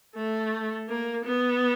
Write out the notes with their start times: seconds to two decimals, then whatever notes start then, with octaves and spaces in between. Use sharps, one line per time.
0.15 A3
0.89 A#3
1.25 B3